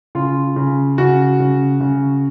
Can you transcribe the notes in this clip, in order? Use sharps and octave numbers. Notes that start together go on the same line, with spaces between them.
C#3 F4
C#3
C#3 F#4
C#3
C#3